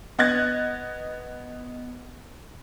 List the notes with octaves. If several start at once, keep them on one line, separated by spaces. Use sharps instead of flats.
B3 D#5 F#6 G#6 A6